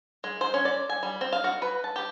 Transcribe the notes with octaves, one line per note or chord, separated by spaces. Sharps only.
G#3
C5
C#4
D5
G#5
G3
C4
F5
F#4
B4
A5
G4